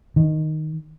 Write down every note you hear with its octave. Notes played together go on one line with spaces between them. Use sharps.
D#3